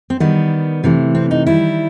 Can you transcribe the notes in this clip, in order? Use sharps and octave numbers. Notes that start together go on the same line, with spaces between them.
C4
D#3 G3 B3
C3 E3 A3
C4
D#4
D#3 G3 E4